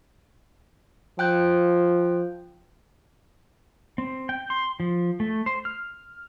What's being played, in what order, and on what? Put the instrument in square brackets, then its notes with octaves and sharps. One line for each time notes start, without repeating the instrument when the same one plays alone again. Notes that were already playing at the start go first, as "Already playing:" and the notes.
[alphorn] F3 [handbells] G5 F#6 G6
[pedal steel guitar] C4
G5
C6
F3
A3
C5
F6